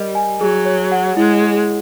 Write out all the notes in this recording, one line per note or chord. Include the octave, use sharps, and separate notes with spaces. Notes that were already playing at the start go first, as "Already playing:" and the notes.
Already playing: G3 A#4 D#5
G#5
F#3 G#4
C#5
F#5
G#3 E4
G#4